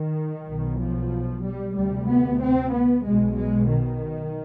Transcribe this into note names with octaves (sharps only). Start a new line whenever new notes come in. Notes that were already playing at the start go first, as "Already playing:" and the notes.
Already playing: D#3
B1 B2
F3
G3
D2 C3 G3
B3
C4
B3
B1 B2 G#3
G#3
D#3